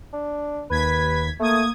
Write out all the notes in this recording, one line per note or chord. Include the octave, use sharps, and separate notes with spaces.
D4
D#2 B4 G#6 B6
A3 A#3 D#6 G#6